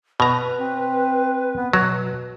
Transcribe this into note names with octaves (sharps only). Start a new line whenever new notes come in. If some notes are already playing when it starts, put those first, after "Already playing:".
B2 B4 A#5
C4
B3
B2 F#3